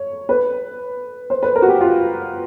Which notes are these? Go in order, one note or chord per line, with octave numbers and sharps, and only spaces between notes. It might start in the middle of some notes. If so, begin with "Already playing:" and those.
Already playing: C#5
B4
C5
B4
A#4
F#4
G4
F4